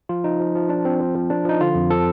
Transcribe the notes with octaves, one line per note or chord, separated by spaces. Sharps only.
F3 F4
F3 D#4
F3
F3
F3 D4
F3 C4
F3
F3
F3 D4
F3 D#4
D3 F4
F2
F3 A4